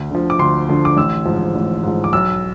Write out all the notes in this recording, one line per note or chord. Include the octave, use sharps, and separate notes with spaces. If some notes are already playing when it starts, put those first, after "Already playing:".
Already playing: D2
D3 F3
D6
D2 C6
D3 F3
D6
A1 E6
G#2 F3
A1
G#2 F3
D6
B1 E6